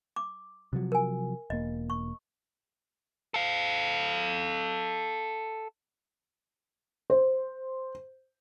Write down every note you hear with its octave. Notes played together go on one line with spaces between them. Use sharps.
D6
C3 F3 F#3
A#4 G#5
E1 A#3 D#5
C#6
A4 F5
C5